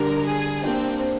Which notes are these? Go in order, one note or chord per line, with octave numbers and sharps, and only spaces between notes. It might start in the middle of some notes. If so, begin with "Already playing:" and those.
Already playing: D3 G3 D4 A#4
G#4
A#3 C4 D4 G4 D5